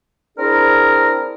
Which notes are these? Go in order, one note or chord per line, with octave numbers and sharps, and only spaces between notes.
C4 D4 E4 G#4 A#4